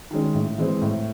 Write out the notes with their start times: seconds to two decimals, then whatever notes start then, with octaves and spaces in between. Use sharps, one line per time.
0.11 D#3 G#3 C#4
0.34 A2
0.58 E3 G#3 C4
0.82 A2